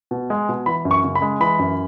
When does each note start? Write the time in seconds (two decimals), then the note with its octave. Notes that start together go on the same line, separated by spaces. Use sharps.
0.11 B2
0.30 G#3
0.49 B2
0.66 E3 B5
0.85 F#2
0.91 C#6
1.04 C#3
1.15 B5
1.22 G#3
1.40 E3 B5
1.59 F#2